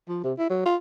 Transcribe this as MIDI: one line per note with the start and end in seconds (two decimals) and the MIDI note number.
0.08 0.21 53
0.24 0.33 48
0.39 0.49 64
0.50 0.62 54
0.66 0.76 65